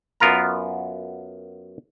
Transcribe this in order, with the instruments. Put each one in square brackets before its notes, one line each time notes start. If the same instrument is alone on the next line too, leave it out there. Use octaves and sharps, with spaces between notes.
[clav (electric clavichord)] F#2 B3 F4 A#4 A#5